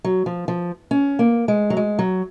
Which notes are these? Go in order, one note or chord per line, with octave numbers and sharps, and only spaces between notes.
F#3
F3
F3
C#4
A#3
G#3
F#3
G#3
F#3